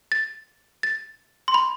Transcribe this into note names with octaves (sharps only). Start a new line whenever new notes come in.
A6
A6
C6
B5